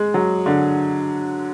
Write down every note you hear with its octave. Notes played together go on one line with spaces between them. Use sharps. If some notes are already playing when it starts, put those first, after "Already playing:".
Already playing: G#3
F#3
D3